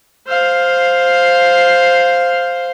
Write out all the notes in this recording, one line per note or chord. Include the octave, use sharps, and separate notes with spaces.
C5 F5